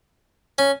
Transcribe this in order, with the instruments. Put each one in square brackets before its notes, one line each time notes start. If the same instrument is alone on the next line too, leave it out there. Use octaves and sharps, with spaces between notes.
[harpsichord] C#4